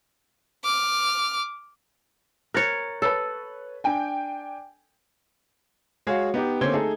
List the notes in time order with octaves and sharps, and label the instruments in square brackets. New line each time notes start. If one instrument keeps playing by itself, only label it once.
[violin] D6 F6
[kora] A#4 C#5 [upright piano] F#6 A6
[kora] A4 [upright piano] B4 C#5
[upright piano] D4 G5 G#5
[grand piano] G#3 F#4 G#4 C#5 F5
B3 D#4 G4
D3 A#3 C4 C#4 G#6 G7
A3 D#4 G#4 A4